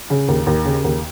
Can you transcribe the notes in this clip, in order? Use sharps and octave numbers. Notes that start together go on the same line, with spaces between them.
C#3
D#2
D#2
C#3
D#2